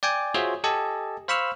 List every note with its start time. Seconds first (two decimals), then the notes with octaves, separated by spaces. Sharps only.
0.03 D5 G5 G#5 D6
0.34 F4 F#4 G#4 C5 C#5 E5
0.64 G4 A4 D#5 G#5 A5
1.28 C5 F5 B5 C#6 E6 F6